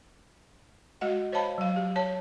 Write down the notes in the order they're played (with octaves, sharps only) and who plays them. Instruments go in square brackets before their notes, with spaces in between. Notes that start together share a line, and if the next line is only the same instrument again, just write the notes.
[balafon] G#3 F#4 D#5 F#5
C5 C#5 D#5 F5 A5 B5
F#3 F5
F#3 G4
C#5 A5